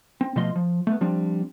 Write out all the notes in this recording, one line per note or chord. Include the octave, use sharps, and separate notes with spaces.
C4
B2 F3 A3 F4 D#5 C6
F3
A3 B3
F3 G3 C4 D4